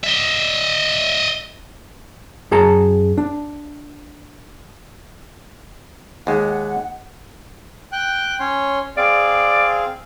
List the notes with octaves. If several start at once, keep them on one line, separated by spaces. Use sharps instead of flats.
D#5 E5
F#2 G#4 A5 A#5
D4
D#2 G#3 F#5
G5 F#6
C#4 C#5 C6
C4 G#4 D5 F5